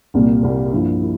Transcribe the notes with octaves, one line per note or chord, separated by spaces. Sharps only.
C2 A#2 G3 A#3
C2 A#2 G3 A#3
G2 F3 A#3 E4
E4